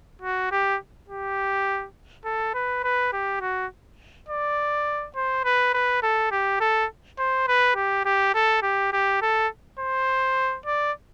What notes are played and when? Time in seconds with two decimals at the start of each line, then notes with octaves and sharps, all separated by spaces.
0.22 F#4
0.51 G4
1.09 G4
2.25 A4
2.54 B4
2.84 B4
3.13 G4
3.41 F#4
4.29 D5
5.16 C5
5.45 B4
5.74 B4
6.02 A4
6.31 G4
6.60 A4
7.19 C5
7.48 B4
7.76 G4
8.05 G4
8.35 A4
8.63 G4
8.93 G4
9.22 A4
9.80 C5
10.66 D5